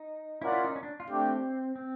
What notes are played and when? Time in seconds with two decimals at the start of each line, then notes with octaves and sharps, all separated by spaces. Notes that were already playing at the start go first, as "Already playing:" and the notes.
Already playing: D#4
0.41 C#4 E4 F4 A#4 D5 F#5
0.52 E4
0.64 D#4
0.76 C#4
0.83 D4
1.00 F4
1.08 A3 C4 D4 G4
1.76 C4